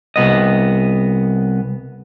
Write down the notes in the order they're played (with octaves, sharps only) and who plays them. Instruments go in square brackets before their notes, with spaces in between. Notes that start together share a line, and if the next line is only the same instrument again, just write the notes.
[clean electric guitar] C2 B3 D#5